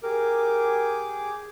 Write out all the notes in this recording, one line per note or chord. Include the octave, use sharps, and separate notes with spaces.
G4 G#4 A#4 D6